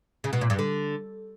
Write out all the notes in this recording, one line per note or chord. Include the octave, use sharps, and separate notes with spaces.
C#3
B2
A#2
G2
D3